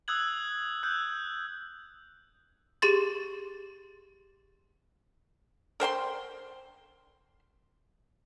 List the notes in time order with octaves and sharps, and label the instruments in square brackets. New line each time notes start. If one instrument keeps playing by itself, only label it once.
[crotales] D#6 E6 F#6 G#6 F#7
E6 F#6 G6
[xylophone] G4 G#4 C6 A6
[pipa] A#4 C5 G5 C6